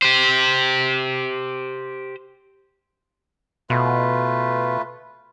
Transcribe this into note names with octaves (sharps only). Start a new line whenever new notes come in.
G4 C5
B2 A3 F4 B4